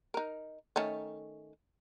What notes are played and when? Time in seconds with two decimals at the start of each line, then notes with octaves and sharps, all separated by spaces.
0.14 D#4 A#4
0.76 D#3 A3 C#4